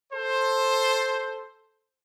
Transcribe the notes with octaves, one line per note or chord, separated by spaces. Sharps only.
A4 C5